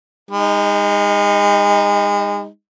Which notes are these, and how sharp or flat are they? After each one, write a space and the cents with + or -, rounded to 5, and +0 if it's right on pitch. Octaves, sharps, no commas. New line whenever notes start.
G#3 -35 D#4 +0